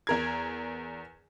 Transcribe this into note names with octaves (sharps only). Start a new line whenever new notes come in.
E2 A#4 G#6